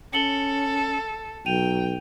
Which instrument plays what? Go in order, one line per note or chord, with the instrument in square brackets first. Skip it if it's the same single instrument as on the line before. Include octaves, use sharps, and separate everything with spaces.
[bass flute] C#4 [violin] A4 [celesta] C#7 F#7 G7
[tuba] B1 [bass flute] F#3 [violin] G5 [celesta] D#7 F7